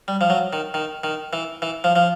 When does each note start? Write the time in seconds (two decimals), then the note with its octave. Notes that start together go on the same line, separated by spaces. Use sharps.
0.08 G3
0.21 F3
0.30 F#3
0.53 D#3
0.74 D#3
1.04 D#3
1.33 E3
1.62 E3
1.84 F3
1.96 F3